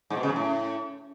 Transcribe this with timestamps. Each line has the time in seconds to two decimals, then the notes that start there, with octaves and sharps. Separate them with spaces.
0.10 G#2
0.17 B2
0.23 C#3
0.30 F#2
0.36 A2